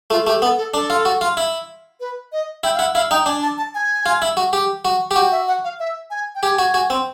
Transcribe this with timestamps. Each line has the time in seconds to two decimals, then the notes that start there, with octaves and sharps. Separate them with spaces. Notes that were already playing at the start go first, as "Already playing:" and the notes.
0.10 A3 F4
0.26 A3 G4
0.42 B3 A4
0.58 A4
0.74 D4 A4
0.90 F4
1.05 F#4
1.21 F4
1.37 E4
2.00 B4
2.32 D#5
2.64 E4 G5
2.75 F5
2.79 E4 F#5
2.95 E4 F5
3.11 D#4 G5
3.26 D4 G#5
3.42 A5
3.58 A5
3.75 G#5
4.06 F4
4.22 E4
4.37 F#4
4.53 G4
4.85 F#4
5.11 G4
5.16 F#4 G5
5.31 E5
5.48 F#5
5.64 F5
5.79 E5
6.10 G#5
6.35 G5
6.43 G4 G#5
6.59 F#4
6.74 F#4
6.90 C4